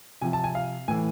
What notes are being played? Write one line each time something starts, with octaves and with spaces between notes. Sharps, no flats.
C3 F3 G#5
A5
G#5
F5
A2 E3 G#5